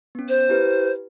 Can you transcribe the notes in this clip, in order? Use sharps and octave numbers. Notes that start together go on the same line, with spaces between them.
B3 C#4
C5
E4 G4 B4